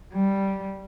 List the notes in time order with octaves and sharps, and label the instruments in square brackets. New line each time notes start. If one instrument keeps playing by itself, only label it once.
[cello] G3